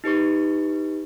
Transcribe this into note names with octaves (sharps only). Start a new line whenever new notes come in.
D#4 G4 B4 C#6